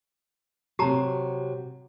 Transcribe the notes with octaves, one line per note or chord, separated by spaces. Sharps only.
C3 F#3 G4 A5 A#5